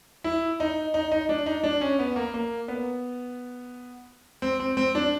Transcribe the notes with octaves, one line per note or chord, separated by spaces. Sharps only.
E4
D#4
D#4
D#4
D4
D#4
D4
C#4
B3
A#3
A#3
B3
C4
C4
C4
D4